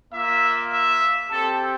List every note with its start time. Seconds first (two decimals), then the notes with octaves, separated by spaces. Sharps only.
0.12 A#3 F4 E5
0.71 E5
1.30 C4 G4 A4